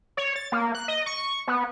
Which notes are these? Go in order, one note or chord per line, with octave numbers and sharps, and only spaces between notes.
C#5
A6
A#3
F#6
D#5
C#6
B3